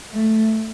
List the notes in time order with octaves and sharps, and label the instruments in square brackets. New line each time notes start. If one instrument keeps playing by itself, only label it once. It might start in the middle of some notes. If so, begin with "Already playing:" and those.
[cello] A3